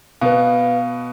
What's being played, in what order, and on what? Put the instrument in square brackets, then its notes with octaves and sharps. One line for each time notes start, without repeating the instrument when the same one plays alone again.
[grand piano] B2 B3 [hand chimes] B4 F5